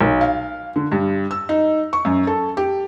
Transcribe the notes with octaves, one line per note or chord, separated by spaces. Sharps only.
B1
F5
D3
G2
E6
D#4
C#6
F#2
A4
G4